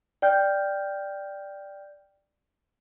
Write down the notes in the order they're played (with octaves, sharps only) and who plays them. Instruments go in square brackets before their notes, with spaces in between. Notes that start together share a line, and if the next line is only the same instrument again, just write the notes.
[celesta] D5 G5 F6 G6